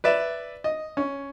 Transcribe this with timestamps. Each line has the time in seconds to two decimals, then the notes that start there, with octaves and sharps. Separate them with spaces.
0.04 B4 D5 E5
0.64 D#5
0.97 C#4